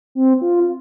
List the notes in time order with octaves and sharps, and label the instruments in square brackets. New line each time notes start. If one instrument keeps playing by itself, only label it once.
[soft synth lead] C4
F4